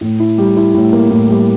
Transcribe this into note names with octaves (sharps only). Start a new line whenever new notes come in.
A2
E4
G3
E4
A2
A#3
A2
G3